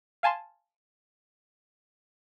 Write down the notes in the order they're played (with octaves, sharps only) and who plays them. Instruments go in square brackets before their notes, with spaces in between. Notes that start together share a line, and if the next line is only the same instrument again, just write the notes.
[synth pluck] F5 G#5 A5 C6